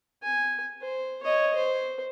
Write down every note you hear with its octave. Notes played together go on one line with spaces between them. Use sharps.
G#5
C5
C#5 D#5
C5